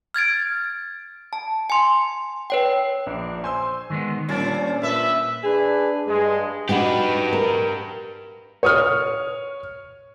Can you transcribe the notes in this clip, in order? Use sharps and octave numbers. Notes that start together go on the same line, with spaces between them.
F6 G#6 A6 D7
A5
G#5 C6
B4 C#5 G5
A#1 D4
C5 G#5 C6 E6
D#3 G#3 B3
A#2 G3 C#4 D4 C5 D5 A5
A#2 B4 E5
D4 G#4 B4
G2 G#3
D4 D#4 F#4 G4 B4
A#4
C#5 D#6 F6